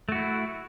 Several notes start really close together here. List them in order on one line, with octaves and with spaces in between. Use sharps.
A3 F#4 E4